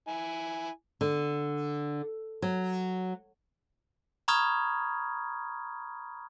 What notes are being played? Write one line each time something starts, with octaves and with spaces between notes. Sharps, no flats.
E4 G#5
D3
F#3
A#5 B5 C#6 D#6 F6 G#6